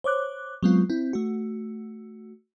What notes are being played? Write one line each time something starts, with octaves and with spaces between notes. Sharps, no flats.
C5 C#5 D6 F#6
F#3 G#3 B3 C4 F4
C4 E4
A3 F#4